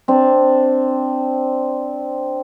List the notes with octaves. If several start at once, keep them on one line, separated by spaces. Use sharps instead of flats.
C4 D4